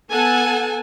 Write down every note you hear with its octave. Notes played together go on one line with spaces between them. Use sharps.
B3 A4 F#5 G#5 A5